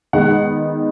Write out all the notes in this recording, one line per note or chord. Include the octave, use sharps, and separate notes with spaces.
D#3 G#3 B3 F#5